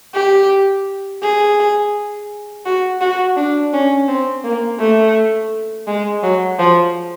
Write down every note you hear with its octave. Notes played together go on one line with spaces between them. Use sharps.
G4
G#4
F#4
F#4
D4
C#4
C4
A#3
A3
G#3
F#3
F3